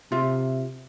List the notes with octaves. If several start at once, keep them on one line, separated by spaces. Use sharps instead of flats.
C3 F4 E5